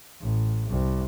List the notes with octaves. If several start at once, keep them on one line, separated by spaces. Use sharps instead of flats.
A1
C2